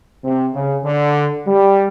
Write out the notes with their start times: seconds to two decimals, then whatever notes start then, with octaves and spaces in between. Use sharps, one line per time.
0.24 C3
0.54 C#3
0.84 D3
1.45 G3